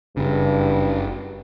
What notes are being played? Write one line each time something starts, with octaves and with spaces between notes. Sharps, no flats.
F#1 G2 C#3